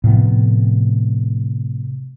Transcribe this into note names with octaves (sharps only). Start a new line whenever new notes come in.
A2 C3 F3 B3